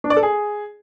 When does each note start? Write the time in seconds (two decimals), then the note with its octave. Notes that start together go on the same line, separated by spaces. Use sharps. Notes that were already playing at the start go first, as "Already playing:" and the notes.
0.04 D4
0.10 D5
0.17 A4
0.23 G#4